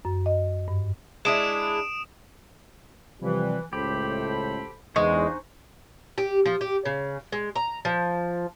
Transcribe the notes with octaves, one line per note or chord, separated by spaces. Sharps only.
F#2
D#5
G2
G#3 D4 E4 D#6 D7 E7
C3 E3 F3 G3
C#2 A2 G4 A4 C5 B5
E2 G#3 B3 D4 D#4 C5 G#5 C#6
G4
F3
G4
C#3
G#3
A#5
F3